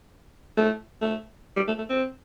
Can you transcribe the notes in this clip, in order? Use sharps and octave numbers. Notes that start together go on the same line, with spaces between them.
A3
A3
G3
A3
A3
C4